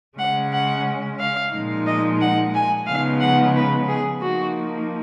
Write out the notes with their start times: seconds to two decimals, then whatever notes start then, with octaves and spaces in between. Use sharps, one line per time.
0.18 C#3 G#3 C#4 F#5
0.52 F#5
1.20 F5
1.53 A#2 F3 G#3 D#4
1.87 D#5
2.20 F#5
2.54 G#5
2.87 C#3 F3 G#3 B3 D#4 F5
3.21 F#5
3.55 B4
3.88 G#4
4.22 F3 A#3 D#4 F#4